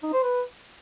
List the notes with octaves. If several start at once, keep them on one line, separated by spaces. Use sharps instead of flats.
D#4
C5
B4